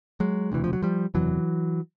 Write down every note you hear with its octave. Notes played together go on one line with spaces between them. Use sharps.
F#3 G#3
E1 D2 C3 E3
F3
F#3
F3 G3
F#1 E2 C3 E3 F#3